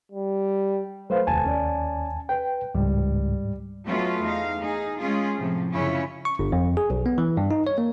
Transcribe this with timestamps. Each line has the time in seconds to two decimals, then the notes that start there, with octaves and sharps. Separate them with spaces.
0.12 G3
1.10 F#3 A3 B4 C5 F5
1.27 F1 D#2 G#5 A5
1.44 C#4 D5
2.29 B4 G5
2.75 C#2 G#2 G3
3.86 F#3 A3 B3 C#4 F4 F#4
4.22 E2 D#4 F5
4.61 D#4 G#4
5.01 G#3 C#4 F4 G#4
5.37 A2 C3 F3
5.73 F#2 C#3 C#4 E4 F4 C#5
6.25 C#6
6.39 G1
6.52 F2
6.77 G#4
6.90 B1
7.06 B3
7.18 E3
7.37 G2
7.51 D#4
7.67 C#5
7.78 A#3